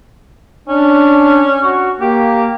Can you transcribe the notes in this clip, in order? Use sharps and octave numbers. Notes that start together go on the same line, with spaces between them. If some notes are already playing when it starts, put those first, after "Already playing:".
C#4 D4
F#4 C#6
A#3 G4